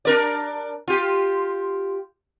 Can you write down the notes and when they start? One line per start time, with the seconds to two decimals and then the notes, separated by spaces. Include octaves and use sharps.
0.05 D4 A#4 D5
0.88 F4 G4